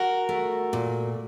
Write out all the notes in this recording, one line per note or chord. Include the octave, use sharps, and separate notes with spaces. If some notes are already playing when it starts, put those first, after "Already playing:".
Already playing: F#4 A#4
A3
A#2